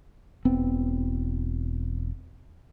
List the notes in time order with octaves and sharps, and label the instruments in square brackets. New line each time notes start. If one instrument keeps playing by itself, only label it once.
[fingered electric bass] E1 B3 C4